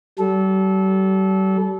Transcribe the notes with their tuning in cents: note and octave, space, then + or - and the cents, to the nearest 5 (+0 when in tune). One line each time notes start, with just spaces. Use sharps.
G3 -45 A4 -25